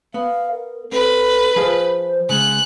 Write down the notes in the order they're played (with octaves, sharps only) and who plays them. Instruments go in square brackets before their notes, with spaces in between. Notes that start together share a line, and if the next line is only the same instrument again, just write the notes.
[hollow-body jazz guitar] B3 [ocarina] F5
[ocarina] A#4
[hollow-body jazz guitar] C4 [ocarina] A4 [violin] B4
[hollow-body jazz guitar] F3 G#4 F5 [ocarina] C5
[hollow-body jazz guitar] C#3 G#3 [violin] F#6